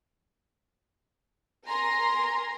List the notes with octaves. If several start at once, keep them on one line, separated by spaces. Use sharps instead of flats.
A#4 G#5 A#5 C6